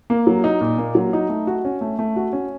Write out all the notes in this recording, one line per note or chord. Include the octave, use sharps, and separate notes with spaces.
A#3
F#3
D#4
A#2
A#3
F#3
D#4
A3
F#4
C#4
A3
A3
F#4
C#4